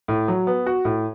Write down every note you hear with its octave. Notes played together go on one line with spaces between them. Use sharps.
A2
F#3
B3
F#4
A2